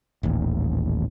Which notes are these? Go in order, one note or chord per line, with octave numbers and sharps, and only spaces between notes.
D#1 A1 D#2